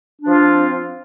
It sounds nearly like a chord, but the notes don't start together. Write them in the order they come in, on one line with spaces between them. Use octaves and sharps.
D4 F3 F4 C4